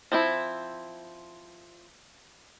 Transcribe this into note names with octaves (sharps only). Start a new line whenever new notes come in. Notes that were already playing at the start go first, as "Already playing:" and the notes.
F3 C4 E4